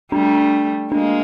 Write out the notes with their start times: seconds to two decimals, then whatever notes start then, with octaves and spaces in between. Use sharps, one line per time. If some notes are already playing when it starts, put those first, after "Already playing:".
0.12 G3 A3 D4
0.92 G#3 A#3 D4